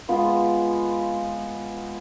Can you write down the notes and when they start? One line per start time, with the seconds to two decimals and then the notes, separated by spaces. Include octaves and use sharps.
0.09 G#3 B3 F4